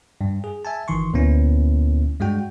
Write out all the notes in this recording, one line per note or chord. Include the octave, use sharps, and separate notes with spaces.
G2
G#4
E5 G#5 A5
G1 D#3 E3 C6 C#6
D2 A#2 A#3 B3 C#4 E4
G2 G#3 D4 F#4 G5